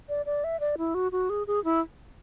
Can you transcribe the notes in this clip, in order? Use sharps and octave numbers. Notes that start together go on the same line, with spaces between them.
D5
D5
E5
D5
E4
F#4
F#4
G#4
G#4
E4